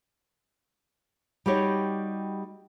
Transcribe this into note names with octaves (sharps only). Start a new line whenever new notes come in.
G3 D#4 F#4 G4 C#5